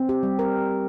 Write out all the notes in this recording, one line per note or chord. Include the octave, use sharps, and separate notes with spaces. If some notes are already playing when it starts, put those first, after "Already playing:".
Already playing: C4
G4
G3
A#4